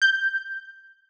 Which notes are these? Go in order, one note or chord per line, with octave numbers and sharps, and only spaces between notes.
G6